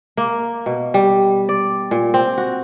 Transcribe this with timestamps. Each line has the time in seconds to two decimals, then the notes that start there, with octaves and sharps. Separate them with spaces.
0.17 A#3
0.66 B2
0.94 G3
1.49 D5
1.91 A#2
2.14 C4
2.38 F#4